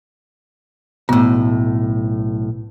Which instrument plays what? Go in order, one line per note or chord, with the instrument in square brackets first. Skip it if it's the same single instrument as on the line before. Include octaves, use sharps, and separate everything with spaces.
[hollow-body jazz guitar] B1 A2 [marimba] B3